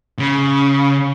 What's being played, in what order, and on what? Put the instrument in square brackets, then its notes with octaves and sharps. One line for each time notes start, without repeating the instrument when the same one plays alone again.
[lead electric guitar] C#3